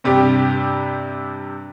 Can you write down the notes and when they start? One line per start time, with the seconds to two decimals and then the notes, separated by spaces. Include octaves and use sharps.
0.04 G2 C3 G3 G4